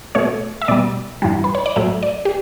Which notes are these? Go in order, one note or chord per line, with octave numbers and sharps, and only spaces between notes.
B2 A3 C#5
E5
B2 G3 D5
G2 E3 G3
B4
C#5
D5
A2 F#3 A3 E5
D5
G4